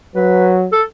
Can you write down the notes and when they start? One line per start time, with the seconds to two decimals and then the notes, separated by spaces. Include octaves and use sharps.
0.15 F#3 B4
0.72 A4